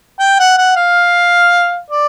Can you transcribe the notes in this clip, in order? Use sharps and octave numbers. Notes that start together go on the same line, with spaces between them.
G5
F#5
F#5
F5
D5